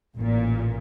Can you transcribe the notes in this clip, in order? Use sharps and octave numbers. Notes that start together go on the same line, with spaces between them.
A1 A#2